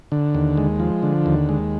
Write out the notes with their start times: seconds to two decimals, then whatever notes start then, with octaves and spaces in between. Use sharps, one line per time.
0.12 D3
0.35 D#2
0.57 G#3
0.80 F3
1.03 D3
1.26 D#2
1.49 G#3